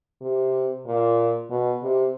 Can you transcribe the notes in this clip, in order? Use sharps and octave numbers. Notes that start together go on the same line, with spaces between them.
C3
A#2
B2
C3